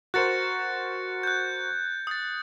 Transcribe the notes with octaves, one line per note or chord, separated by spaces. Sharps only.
F#4 A#4 C5 F#6 A6 C#7
F#6 G6
D#6 A6